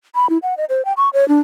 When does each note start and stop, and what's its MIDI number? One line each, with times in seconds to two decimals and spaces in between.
0.15 0.29 83
0.30 0.38 64
0.43 0.56 78
0.57 0.65 75
0.70 0.84 72
0.85 0.93 79
0.97 1.09 85
1.13 1.27 73
1.28 1.41 62